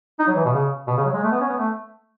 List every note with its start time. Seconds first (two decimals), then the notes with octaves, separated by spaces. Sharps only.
0.19 D#4
0.28 F#3
0.36 E3
0.45 B2
0.54 C#3
0.87 B2
0.97 C#3
1.05 F#3
1.13 G#3
1.23 A3
1.31 B3
1.41 C#4
1.49 B3
1.57 A3